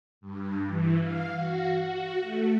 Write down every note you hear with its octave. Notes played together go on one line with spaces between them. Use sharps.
G2
E3
F5
F#4
F#4
A3